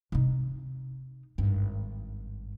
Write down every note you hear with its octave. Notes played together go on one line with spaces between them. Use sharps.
C3 D#4
G#1 G2